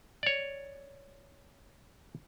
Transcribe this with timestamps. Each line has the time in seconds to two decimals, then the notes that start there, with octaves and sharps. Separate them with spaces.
0.23 C#5 D5